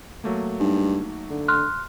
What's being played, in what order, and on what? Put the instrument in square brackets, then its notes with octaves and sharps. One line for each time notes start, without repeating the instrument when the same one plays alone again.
[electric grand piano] F#3 A3 A#3
[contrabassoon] G2 [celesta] D#4
[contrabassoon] D3
[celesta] C6 F6 F#6